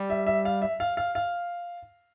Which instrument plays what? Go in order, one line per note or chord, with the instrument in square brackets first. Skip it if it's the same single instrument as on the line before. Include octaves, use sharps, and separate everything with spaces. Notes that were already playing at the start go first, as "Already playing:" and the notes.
Already playing: [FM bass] G3
[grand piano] E5
E5
F5
E5
F5
F5
F5